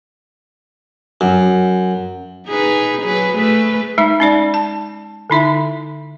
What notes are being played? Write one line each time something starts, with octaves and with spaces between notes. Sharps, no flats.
F#2
D#4 G#4 B4
F#3 G#4 B4
A3 G#4 B4
G#3 D#4 E5
C#4 D#4 D5
A5
D3 D#4 E4 E5